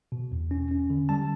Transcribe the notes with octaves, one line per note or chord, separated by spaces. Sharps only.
B2
E2
C#4
C#4
D3
G3 A5